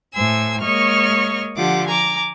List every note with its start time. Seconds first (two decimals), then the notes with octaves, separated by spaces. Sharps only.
0.14 A2 C5 G#5 E6
0.61 G#3 A#3 C#5 D#5 C#6 F6
1.55 D3 F3 F4 G4 F#5 D6
1.85 G#5 A#5 D6